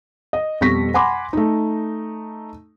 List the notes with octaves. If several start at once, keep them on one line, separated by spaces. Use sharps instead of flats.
D#5
F2 B2 G3 C#6 A#6 B6
F#5 G#5 B5 C6 D6
A3 D#4